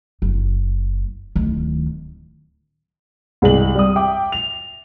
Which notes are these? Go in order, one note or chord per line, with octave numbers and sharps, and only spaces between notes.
F#1
D1 D#3
C2 G#3 F#7
G3 D#6
E5 G5 D6
F7